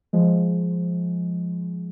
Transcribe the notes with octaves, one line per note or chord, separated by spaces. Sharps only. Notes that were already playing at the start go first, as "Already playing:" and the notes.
F3 G#3